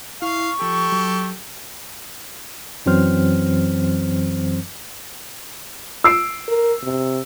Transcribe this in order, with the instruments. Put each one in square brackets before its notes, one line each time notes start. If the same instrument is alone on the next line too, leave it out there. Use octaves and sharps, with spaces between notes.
[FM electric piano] E4 [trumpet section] F5 [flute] C#6
[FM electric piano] F3 [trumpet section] G4 A4
[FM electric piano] F#3
[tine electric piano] F#2 E3 F#3 C4 C5 F6
[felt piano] E6 C7 D7
[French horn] A#4
C3